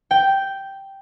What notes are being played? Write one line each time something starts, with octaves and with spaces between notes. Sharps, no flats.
G5